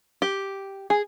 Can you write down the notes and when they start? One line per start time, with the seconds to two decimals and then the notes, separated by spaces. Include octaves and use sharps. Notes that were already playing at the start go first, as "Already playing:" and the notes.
0.22 G4
0.90 G#4